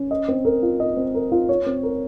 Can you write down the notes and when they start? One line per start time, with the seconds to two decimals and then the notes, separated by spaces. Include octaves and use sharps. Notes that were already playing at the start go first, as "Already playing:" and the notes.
Already playing: C#4
0.11 D#5
0.28 C4
0.45 A#4
0.63 F4
0.80 D#5
0.97 C4
1.14 A#4
1.32 F4
1.49 C#5
1.66 C4
1.83 A#4